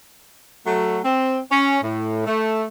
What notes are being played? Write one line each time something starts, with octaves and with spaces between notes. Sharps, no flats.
F#3 A3
C4
C#4
A2
A3